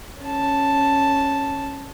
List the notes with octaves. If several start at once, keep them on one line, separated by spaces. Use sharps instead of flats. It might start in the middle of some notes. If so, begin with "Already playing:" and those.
C#4 A5